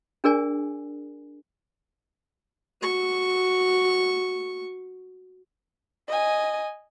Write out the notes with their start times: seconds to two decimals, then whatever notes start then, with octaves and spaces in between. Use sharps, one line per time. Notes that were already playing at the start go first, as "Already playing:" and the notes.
0.24 D4 G#4 A#4 D5 G#5
2.81 F#4 C#6
6.08 D#5 G#5